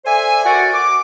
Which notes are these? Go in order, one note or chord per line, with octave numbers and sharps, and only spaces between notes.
A4 C5 D5 E5 G#5
F#4 A#4 D5 F#5
D6